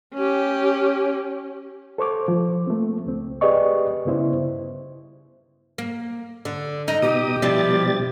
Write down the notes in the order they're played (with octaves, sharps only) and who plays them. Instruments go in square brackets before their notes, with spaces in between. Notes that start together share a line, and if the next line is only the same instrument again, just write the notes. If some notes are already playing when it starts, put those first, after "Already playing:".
[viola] C#4 G4
[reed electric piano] A4 C5 C#6 D6
F3
A3 A#3 C4
C#2 C4
G4 G#4 B4 D5 D#5 C#6
G2 C#3 B3 E4 C5
[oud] A#3
D3
[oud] D#4 [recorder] A#5
[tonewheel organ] B2 D#6 [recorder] G4
[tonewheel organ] B2 G3 A6 [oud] F3 D4 E4